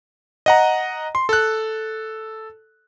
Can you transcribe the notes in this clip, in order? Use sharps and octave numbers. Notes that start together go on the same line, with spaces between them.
D#5 F#5 A#5
C6
A4 F#6